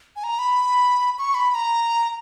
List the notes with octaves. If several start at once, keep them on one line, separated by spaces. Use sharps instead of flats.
G#5
A#5
B5
C#6
B5
B5
A#5